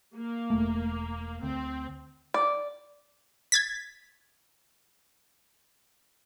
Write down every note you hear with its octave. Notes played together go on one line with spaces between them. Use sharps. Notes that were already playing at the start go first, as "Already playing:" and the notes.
A#3
E1 A3
D2 C4
D5
G#6 A6 B6